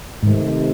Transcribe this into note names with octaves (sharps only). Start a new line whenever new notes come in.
G#2 C3 D#3 A3